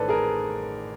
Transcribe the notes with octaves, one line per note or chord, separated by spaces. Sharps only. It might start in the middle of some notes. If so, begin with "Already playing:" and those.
Already playing: A1 D#3 A4 B4 C5 D5
G#4 A#4